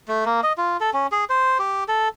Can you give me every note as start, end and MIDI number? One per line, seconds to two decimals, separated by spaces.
0.08 0.24 57
0.26 0.41 58
0.43 0.53 75
0.58 0.77 65
0.81 0.90 69
0.93 1.07 61
1.12 1.25 68
1.30 1.58 72
1.59 1.84 67
1.88 2.08 69